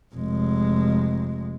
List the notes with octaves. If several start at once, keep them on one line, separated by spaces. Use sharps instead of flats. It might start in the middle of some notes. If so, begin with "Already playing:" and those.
F1 G#3